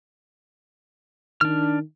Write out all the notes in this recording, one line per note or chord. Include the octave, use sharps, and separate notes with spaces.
D#3 D4 F6